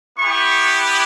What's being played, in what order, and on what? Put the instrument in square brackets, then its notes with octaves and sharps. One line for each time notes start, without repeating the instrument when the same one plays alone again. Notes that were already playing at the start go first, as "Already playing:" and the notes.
[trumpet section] B3 E4 G4 C#6